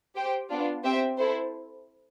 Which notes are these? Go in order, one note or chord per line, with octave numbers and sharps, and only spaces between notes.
G4 C5 G5
B3 D4 F4
C4 G4 C5 E5 G5
E4 A4 C5